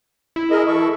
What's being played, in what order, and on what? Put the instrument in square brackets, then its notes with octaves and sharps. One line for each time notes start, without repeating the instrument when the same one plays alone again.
[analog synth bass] E4
[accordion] G#4 A#4 D#5
E3 A4 C#6